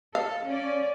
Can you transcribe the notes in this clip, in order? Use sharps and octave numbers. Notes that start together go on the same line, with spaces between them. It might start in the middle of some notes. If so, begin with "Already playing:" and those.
A4 F5
C#4 D5